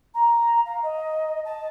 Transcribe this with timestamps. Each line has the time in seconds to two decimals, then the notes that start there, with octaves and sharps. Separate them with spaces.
0.14 A#5
0.66 F5
0.83 D#5
1.45 A5